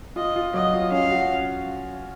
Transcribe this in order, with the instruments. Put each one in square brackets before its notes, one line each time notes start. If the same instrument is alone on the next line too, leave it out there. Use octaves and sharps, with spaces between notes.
[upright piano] F4 [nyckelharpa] D#5
[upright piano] F4
[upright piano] F#3 [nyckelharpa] D#5
[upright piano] F4
[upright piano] C#4 [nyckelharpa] F5
[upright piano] F#4